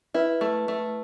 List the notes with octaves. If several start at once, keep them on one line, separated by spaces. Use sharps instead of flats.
E4 B4
A3
A3